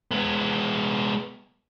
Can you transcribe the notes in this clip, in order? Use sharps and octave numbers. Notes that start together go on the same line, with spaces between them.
G#3 B3